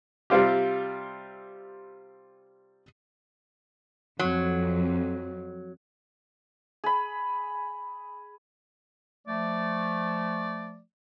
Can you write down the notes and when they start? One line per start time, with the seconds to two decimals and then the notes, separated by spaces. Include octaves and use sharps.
0.30 C3 G3 C4 F4 G4
4.19 F2 F#3
6.84 G#4 B5
9.28 F3 A3 D5